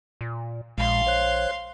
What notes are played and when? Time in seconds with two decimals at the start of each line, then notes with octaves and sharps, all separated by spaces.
0.21 A#2
0.78 A#1 A#2 G#3 F5 C6
1.07 C5 C#5 F#6